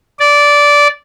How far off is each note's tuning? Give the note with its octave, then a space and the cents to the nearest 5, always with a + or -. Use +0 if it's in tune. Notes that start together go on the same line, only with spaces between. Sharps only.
D5 -15